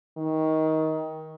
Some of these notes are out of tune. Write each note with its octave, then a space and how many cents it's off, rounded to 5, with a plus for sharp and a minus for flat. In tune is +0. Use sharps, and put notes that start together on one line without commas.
D#3 +20